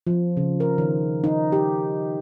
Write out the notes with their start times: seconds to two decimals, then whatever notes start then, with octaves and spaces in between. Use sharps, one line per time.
0.07 F3
0.37 C#3
0.60 A#4
0.78 D#3
1.24 D#4
1.52 G4